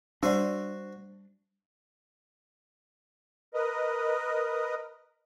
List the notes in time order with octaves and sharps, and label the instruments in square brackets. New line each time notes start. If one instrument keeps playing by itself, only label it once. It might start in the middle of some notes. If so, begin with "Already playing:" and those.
[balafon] G3 D5 [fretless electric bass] D4 [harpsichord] F#4 C5 C#6
[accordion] A#4 B4 D#5